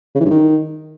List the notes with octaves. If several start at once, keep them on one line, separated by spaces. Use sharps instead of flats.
C#3
E3
G2
D#3